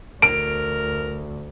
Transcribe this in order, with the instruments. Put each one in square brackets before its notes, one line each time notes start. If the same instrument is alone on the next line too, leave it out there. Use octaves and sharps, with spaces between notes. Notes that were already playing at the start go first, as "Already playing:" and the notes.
[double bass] D2 [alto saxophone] A#4 [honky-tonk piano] D7